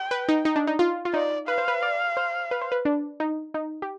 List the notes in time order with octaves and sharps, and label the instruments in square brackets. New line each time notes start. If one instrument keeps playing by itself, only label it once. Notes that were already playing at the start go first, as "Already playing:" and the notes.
Already playing: [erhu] G5
[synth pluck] B4
D#4
D#4
D4
D#4
F4
F4
[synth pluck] D#4 [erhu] D5
[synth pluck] B4 [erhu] F5
[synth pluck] C5
B4
D5
C5
B4
C5
B4
D4
D#4
D#4
G4